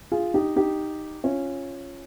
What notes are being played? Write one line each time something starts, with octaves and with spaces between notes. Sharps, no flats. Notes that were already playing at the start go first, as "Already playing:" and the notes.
F4 G#4
D#4 G4
D#4 G4
C#4 F4